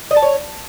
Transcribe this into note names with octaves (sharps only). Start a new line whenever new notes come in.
D#5
A5
C#5